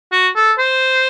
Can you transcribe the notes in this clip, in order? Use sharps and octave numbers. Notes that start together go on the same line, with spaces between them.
F#4
A4
C5